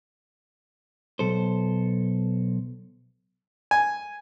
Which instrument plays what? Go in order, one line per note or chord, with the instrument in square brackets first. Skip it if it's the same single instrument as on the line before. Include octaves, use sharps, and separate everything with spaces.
[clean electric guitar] B1 A4 C5
[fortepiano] G#5